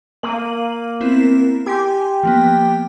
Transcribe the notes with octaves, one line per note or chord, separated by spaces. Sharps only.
A#3 D#7 F#7
B3 C4 E4
G4 G#5 C6
F3 A#3 B3